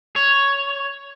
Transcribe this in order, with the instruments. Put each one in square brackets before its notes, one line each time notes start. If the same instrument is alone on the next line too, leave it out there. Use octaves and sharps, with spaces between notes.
[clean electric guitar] C#5